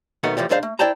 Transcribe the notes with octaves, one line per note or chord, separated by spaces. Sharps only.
B1 B2 D#3 A3 B3 F#5
A2 E3 F3 G3
B1 F#2 G#3 D4 C5 F5
A3
E4 C5 D5 G5 A5 A#5